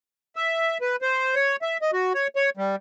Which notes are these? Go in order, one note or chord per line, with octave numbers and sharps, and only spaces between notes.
E5
B4
C5
C#5
E5
D#5
F#4
C#5
C#5
G3